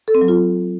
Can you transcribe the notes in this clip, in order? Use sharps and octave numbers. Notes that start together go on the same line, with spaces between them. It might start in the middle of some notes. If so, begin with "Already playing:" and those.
A4
C4
F#3
F4